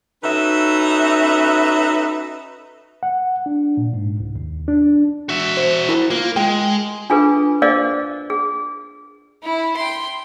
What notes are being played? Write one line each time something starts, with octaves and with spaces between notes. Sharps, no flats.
C#4 D#4 F#4 A4 B4 E5
F#5
D4
A#2
G#2
C2
D#2
D4
F#4 E5
C5
E4 A#4
A#3 F4
G#3 G5
D4 F4 G#4 A4 B4
G#4 A#4 C5 D5 D#5 F5
G#4
E4
G5 C6